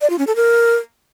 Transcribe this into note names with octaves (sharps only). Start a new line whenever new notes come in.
D5
F4
C#4
A4
A#4